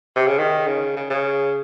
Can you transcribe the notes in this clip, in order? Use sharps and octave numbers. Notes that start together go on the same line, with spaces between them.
C3
C#3
D#3
C#3
C#3
C#3